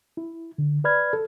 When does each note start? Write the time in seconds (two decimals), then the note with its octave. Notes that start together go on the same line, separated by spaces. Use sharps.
0.17 E4
0.58 D3
0.84 B4 D5 B5 F6 G#6
1.13 A4